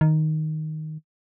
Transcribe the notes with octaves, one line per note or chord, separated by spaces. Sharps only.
D#3